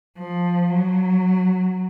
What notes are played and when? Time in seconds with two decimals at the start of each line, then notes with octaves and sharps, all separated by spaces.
0.18 F3
0.70 F#3